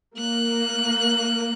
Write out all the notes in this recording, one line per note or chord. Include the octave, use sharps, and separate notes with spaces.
A#3 F#6